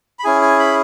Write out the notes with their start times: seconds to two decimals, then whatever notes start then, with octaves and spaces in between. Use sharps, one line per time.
0.19 B5
0.24 C#4 E4 G#4 G#5
0.42 G#5
0.60 B5